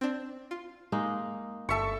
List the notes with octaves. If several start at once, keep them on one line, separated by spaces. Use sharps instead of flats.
C4 D4
F4
G#3 A#3 D#4
G1 A4 E5 C#6 C#7